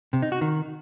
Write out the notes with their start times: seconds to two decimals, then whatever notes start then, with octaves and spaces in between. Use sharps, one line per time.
0.13 C3
0.22 D#4
0.32 F#4
0.41 D#3